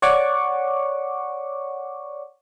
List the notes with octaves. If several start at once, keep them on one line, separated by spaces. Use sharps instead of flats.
C#5 D5 F#5 C#6 D6